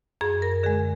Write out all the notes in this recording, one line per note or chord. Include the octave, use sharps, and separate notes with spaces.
F#2 G#4
A#4
D3 G#3 G#4